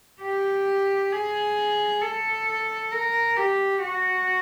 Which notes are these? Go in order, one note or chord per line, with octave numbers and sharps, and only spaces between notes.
G4
G#4
A4
A#4
G4
F#4